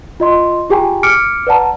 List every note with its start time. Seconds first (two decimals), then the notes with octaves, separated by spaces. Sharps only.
0.20 F4 D#5 C6
0.70 F4 G4 G#4 G5 G#5 A#5
1.03 D6 F6 C#7 D7
1.47 B4 D5 F#5 A5 A#5